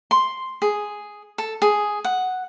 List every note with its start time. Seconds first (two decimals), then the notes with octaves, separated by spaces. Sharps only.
0.11 C6
0.62 G#4
1.38 A4
1.62 G#4
2.04 F#5